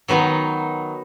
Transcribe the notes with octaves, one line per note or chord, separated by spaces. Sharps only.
D#3 F#3 B3 D#4 F#4